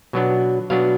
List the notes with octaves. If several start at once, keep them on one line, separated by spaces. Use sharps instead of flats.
B2 F#3 B3 D4
B2 F#3 B3 D4 F5